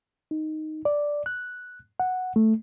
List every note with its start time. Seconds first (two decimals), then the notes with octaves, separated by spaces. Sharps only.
0.31 D#4
0.85 D5
1.26 F#6
2.00 F#5
2.36 A3